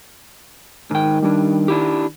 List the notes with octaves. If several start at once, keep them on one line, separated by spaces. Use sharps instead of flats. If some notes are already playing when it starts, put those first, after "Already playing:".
G#2 D#3 G5
G3 D4
D4 E4 G4